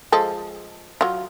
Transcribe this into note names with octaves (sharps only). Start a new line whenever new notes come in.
F3 G#3 A4
F#3 F4